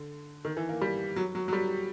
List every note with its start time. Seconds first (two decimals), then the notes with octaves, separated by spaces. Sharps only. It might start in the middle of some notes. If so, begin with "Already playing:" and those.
Already playing: D3
0.45 D#3
0.57 E3
0.69 A#3
0.81 G3
1.16 F#3
1.35 F#3
1.48 F#3
1.53 G3